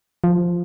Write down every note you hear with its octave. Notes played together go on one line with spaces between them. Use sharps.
F3